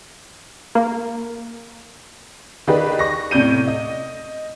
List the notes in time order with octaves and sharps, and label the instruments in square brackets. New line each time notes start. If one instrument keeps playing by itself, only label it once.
[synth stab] A#3
[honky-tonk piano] D#3 D#4 G4 G#4 B4 D5
C#6 A#6
A2 C3 D5 G6 D#7
D#5